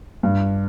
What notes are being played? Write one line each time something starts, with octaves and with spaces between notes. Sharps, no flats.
G2